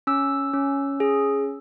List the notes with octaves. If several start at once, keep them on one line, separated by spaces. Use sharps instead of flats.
C#4 E6
C#4
G#4